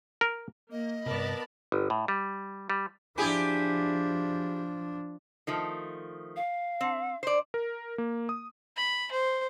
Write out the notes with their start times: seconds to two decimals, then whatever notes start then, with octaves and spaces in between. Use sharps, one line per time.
0.21 A#4
0.71 A#3 D#5
1.06 G2 C3 B3 A#4 D5 A5 B5
1.72 G1
1.90 A2
2.08 G3
2.70 G3
3.18 F3 D4 E4 G4 G#4
5.47 D#3 F3 A3
6.36 F5
6.81 C4
7.23 C5 D5
7.54 A#4
7.98 A#3
8.29 D#6
8.77 B5
9.12 C5